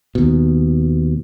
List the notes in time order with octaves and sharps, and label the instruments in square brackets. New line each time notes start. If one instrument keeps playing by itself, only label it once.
[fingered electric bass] D#2 B2